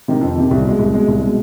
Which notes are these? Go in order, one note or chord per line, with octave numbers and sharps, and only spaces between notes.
C3 D#3
F2
C3 D#3
C2
B2 G#3
C2
B2 G#3
C2
B2 G#3